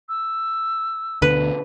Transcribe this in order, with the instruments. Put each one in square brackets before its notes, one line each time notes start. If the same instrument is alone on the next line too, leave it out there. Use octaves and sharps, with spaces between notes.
[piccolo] E6
[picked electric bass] D2 B2 D3 [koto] B4